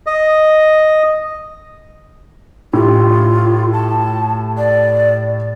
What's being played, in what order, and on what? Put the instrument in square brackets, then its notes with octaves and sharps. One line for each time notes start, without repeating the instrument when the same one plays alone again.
[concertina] D#5
[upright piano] A2 G4 [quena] F4
[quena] A5
D5